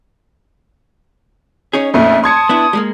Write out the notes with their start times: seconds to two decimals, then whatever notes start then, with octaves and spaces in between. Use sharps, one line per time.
1.73 C#4 D#4 G#4 C#5
1.94 F2 A#2 A3 E5
2.24 A5 C6 D#6 G#6 C#7
2.49 B3 D4 E4
2.73 G3 G#3 A#3